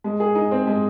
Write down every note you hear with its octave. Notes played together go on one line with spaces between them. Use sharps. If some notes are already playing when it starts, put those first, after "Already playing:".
G#3
G#4
D#4
C4
G#3